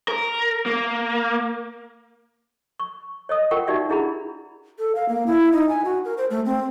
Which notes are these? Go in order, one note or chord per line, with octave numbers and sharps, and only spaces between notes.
A#4
A#3
C#6
C#5 D#5 D#6
F4 A#4 F#5 G5 C#6
D#4 F#4 G4 D5 E5
D4 E4 G#4 F#5 A#5 B5
A4
F5
A#3
E4
D#4
G#5
F#4
A#4
C5
A3
C4